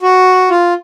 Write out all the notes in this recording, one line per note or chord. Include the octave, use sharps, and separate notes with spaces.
F#4
F4